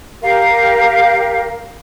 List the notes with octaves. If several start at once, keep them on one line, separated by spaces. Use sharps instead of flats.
G4 A#4 F5